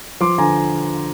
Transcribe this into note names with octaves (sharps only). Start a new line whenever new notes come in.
F3 C6 D6
D3 G#5 A#5